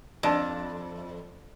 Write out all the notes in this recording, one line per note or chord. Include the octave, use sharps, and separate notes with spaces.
F2 D4 A5